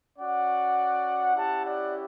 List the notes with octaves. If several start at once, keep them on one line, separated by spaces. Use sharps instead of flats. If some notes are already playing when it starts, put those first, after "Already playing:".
C#4 F#4 D5 F#5
C#4 E4 G4 F#5 A5
D5 F#5